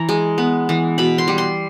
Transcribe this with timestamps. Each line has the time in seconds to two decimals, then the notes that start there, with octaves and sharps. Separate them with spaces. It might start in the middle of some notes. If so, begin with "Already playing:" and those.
Already playing: E3 A#5
0.09 G#3
0.38 B3
0.69 E3
0.98 B2 B5
1.18 C6
1.28 G3
1.38 C6